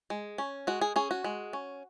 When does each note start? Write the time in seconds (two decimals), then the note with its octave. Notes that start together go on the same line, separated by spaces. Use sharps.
0.10 G#3
0.38 C#4
0.67 G#3 F#4
0.81 G#4
0.96 C#4 G#4
1.11 F#4
1.24 G#3
1.53 C#4